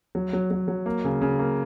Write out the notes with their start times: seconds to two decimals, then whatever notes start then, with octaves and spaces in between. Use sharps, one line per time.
0.15 F#3
0.33 F#3
0.51 F#3
0.68 F#3
0.86 A#3
1.04 C#3
1.22 C#3
1.39 A#3